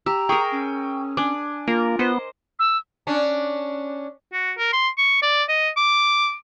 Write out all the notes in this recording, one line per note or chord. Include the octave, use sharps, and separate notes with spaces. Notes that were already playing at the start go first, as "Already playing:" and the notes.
G4 A#5 E6
G#4 A#4 G5 C#6 D#6
C#4
D4 G#5 D6
A#3 F4 A#4
B3 C5 D#5
E6
C#4 D4
F#4
A#4
C6
C#6
D5
D#5
D6